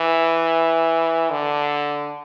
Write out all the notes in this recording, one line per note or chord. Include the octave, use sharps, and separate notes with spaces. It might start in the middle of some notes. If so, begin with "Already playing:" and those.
Already playing: E3
D3